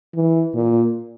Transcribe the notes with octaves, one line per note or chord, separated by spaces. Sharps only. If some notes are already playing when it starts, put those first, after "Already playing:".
E3
A#2